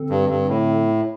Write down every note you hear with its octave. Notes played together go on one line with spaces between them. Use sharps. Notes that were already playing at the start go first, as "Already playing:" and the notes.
Already playing: D3 C4 A4
G2
G2
A2